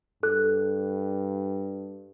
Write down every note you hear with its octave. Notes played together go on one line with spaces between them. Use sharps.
G2 A4 F#6